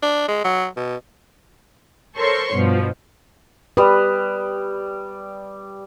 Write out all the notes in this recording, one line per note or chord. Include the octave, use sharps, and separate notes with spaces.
D4
G#3
F#3
B2
A4 A#4 C5 C#5 C6 C#6
G2 B2 F3
G3 B4 D#6